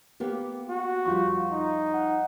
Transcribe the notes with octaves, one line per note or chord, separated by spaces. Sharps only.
A#3 B3 G4
F#4
F2 G3 F4 C#6
D#4
F#5